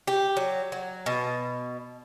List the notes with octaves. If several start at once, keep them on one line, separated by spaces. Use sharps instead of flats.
G4
F#3
F#3
B2